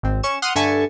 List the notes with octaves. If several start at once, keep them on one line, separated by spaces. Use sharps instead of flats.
G#1 C4
C#4 C#6 E7
F#5 C6 D#6 F6 D#7
G2 D3 E5 G#5 A5 C#6